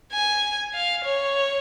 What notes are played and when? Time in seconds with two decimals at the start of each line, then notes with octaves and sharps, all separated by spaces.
0.13 G#5
0.74 F5
1.04 C#5